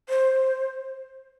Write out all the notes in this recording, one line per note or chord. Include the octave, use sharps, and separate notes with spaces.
C5